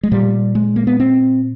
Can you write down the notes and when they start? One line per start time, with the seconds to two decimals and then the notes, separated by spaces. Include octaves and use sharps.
0.03 G#3
0.11 A#2 G3
0.55 G#3
0.76 A#3
0.87 B3
1.00 C4